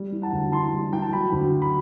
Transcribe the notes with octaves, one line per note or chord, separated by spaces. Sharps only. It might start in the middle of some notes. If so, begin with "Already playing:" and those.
Already playing: G3
E3
F#5 A5
D2
E3 A5 C6
G3
E3 G5
A5
F#3 G5 B5
D2
F#3
B5